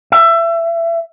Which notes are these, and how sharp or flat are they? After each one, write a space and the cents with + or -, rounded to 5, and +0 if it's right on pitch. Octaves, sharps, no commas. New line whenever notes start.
E5 +25